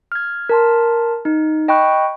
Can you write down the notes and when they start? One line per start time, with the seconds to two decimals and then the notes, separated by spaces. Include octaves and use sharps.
0.12 F6 G#6
0.49 A#4 A5 C6
1.25 D#4
1.68 D#5 G5 B5 C#6 F#6